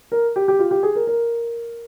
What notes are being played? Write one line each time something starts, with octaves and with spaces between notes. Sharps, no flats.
A#4
G4
G4
F4
G4
G#4
A#4
A#4